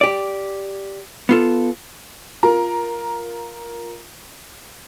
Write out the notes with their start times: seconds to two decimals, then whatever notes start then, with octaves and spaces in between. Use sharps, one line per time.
0.01 G4 D5
1.29 B3 F4 A4
2.43 F4 A#4 A#5